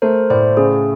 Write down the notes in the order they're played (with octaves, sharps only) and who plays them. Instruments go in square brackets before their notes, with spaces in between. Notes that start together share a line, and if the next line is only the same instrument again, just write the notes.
[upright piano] A3 [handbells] A#4 C5
[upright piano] A2 [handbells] C5 D5
[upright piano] C#3 [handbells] G#4